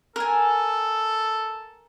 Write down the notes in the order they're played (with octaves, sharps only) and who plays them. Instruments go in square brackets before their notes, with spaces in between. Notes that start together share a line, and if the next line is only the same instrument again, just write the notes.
[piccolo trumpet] A4 [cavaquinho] A#4 G#5